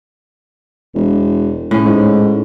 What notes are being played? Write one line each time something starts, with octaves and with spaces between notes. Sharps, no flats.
E1
A2 C#4
G#2